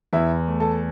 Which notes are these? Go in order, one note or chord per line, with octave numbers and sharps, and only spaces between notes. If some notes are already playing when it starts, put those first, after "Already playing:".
E2 E4 E5
A3
A4 A5